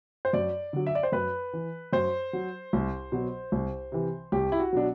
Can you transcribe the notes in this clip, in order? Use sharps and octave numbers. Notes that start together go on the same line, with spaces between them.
C5
F#2 D5
D3 F#3
E5
D5
C5
F#2 B4
E3
F#2 C5
F#3
C2
B2 F#3
C2
C3 E3
C2 G4
E4
F#4
B2 F#3 D4